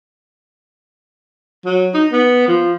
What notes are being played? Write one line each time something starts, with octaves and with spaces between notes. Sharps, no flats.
F#3
D#4
B3
F3